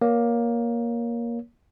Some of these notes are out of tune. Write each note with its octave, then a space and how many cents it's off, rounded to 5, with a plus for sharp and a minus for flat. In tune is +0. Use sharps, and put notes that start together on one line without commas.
A#3 +15 C#5 +20